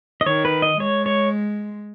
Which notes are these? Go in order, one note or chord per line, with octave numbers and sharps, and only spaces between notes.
D#5
D#3 C#5
B4
D#5
G#3 C#5
C#5